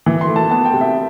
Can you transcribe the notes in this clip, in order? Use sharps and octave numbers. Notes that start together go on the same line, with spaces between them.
E3
C6
A3
A5
B3 A5
G5
C3
E5